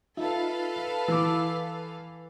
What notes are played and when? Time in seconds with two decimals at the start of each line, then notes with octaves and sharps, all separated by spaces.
0.17 D#4 F4 A4 B4 E5 F5
1.08 E3 D6 E6